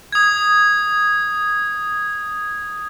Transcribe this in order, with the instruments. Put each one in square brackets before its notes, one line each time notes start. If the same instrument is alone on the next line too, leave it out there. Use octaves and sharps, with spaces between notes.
[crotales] D#6 G#6